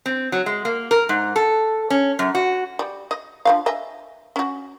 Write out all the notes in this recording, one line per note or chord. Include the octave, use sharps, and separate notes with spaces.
C4
F#3
G#3
A#3
A#4
G#2
A4
C#4
F#2
F#4
G3
D#5
D3 F3 F5
D#5 E5 G#5
C#4 F#4